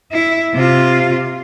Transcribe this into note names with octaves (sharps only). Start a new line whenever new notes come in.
E4
C3 F4